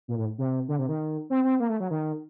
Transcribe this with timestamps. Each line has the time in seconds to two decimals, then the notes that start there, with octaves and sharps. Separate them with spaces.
0.08 A#2
0.18 A2
0.38 C3
0.68 D3
0.79 C3
0.89 D#3
1.30 C4
1.44 C4
1.60 A#3
1.69 A3
1.80 F#3
1.91 D#3